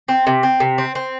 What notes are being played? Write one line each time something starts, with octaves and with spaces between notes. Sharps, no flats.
C4
C3
C4
C3
C4
C4